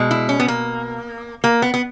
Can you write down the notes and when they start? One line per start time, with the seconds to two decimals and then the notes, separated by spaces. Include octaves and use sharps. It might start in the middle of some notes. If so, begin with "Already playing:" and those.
Already playing: B2 G#3
0.11 E4
0.29 C#4
0.40 B3
0.48 A#3
1.44 A#3
1.62 B3
1.74 B3